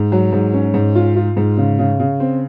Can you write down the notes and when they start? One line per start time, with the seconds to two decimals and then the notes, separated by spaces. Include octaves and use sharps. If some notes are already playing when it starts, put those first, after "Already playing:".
Already playing: G#2
0.12 F#3
0.33 G#2
0.54 C#4
0.74 G#2
0.95 F4
1.16 F4
1.37 G#2
1.58 C#3
1.79 C#3
2.00 C#3
2.20 C4